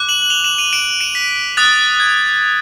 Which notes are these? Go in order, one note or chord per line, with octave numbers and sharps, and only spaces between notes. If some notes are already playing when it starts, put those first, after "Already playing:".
Already playing: D6 F#6
E7 F#7
F#7
F7 G7
E7 F#7
D#7 F7
D7 E7
D7 E7
B6
D#6 F#6 A6
G#6